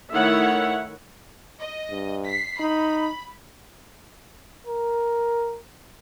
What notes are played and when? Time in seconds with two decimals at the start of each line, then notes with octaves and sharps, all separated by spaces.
0.12 D#3 A3 E4 C#5 E5 F#5
1.60 D#5
1.90 G2
2.27 B6 C7
2.60 D#4 B5
4.67 A#4